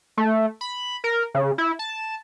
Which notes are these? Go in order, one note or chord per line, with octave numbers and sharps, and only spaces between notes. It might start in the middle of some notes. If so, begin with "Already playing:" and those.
A3
B5
A#4
C#3
E4
A5